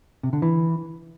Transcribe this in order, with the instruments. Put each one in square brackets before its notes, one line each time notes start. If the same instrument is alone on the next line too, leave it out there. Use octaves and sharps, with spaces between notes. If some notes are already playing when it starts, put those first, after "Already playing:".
[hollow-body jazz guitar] C3
D3
E3